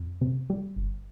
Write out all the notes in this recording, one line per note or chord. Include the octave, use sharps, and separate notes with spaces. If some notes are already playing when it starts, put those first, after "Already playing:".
Already playing: F2
C3
G3
G1